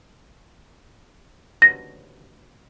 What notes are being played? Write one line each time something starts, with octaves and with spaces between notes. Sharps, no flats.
A#6